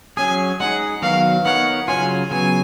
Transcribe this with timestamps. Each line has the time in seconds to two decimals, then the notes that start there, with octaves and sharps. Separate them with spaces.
0.17 F#3 C#4 G#4 G#5
0.60 G#3 D#4 G#4 F#5
1.02 D#3 F#3 B3 F#4 A#4 F5
1.45 B3 D#4 A#4 C#5 F#5
1.88 C#3 F#3 C#4 F4 G#5
2.30 C#3 F#3 B3 G#5